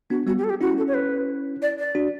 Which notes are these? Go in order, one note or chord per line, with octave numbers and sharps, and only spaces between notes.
B3 D4 F#4
G3 B3 F#4
G4
A4
G4
C#4 E4 F#4
A4
C#5
B4
D5
D5
D4 F#4